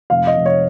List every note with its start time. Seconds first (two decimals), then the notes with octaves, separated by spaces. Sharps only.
0.10 F1 F5
0.27 D#5
0.37 F1
0.46 C#5